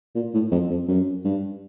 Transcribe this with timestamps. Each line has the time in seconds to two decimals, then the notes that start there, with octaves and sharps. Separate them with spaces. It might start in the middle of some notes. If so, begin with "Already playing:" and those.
0.15 A#2
0.34 A2
0.52 F2
0.70 F2
0.88 F#2
1.25 G2